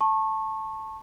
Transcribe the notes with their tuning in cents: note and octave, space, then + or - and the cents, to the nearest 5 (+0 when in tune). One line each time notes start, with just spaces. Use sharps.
A5 +0 C#6 -25